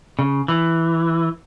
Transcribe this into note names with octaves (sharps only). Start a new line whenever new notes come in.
C#3
E3